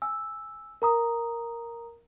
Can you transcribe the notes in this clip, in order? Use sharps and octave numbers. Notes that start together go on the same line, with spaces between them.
G#5 E6
A#4 A#5 D#6